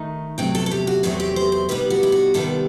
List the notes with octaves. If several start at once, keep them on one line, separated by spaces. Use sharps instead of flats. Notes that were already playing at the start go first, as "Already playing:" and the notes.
Already playing: D#3 A3 D#4
E2 C3 F#3 A3 C4 G5
A4
A4
G4
F#4
E2 C3 F#3 A3 C4 F#4
G4
C5
C5
C3 D#3 G3 B3 B4
F#4
E4
F#4
C3 D#3 G3 B3 A4